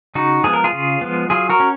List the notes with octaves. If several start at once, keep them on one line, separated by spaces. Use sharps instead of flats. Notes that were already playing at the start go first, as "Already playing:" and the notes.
C#3 D#4 F#4
F3 G#3 B3 G#4
A#4
F4 G#4
C#3
F3 G#3 B3
F#3 F4 G#4
F#4 A#4
C#4